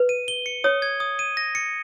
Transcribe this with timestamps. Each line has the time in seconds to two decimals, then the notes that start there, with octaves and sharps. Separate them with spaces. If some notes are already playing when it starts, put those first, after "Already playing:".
Already playing: B4
0.09 D#7
0.28 G7
0.46 C#7
0.64 C#5 D#6
0.82 G#6
1.00 D#6
1.19 D#7
1.37 A#6
1.55 C#7